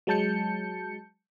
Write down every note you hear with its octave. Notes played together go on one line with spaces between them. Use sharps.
F#3 G#3 A5 G6 C#7